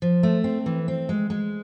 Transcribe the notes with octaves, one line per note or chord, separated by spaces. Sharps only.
F3
A3
C4
E3
C4
G#3
G#3